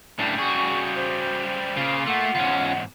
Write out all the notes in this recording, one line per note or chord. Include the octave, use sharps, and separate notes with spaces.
A2 C#3 G3 D4
F#4 G#4 C#6
C5
C#3 A#3 F4
A3 F#5
E2 G#2 C#4 F4